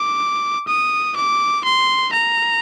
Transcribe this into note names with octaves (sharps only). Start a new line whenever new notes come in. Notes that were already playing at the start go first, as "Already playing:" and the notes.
Already playing: D6
D#6
D6
C6
A#5